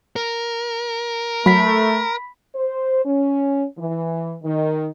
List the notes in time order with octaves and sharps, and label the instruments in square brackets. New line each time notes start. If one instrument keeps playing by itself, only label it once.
[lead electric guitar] A#4
[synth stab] F#3 [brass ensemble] A3 [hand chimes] B5 B6
[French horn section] C5
C#4
E3
D#3